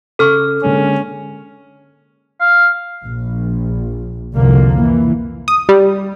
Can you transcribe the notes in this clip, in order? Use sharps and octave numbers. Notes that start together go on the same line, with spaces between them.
C#3 A4 C#6 F6
D3 G#3 A#3 C#4
F5
A#1
C2 F2 D3 A#3
E3
D#6
G3